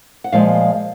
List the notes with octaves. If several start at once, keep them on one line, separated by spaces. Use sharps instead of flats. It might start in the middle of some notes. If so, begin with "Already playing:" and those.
F#5
A#2 F3 G#3 F5